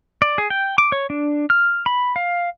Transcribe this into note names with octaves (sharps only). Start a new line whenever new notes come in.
D5
G#4
G5
D6
C#5
D4
F6
B5
F5